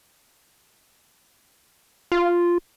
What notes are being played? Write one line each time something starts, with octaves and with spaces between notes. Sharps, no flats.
F4